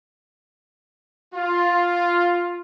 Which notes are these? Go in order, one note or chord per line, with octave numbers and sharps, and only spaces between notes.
F4